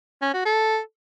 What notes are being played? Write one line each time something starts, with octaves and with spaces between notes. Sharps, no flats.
C#4
F#4
A4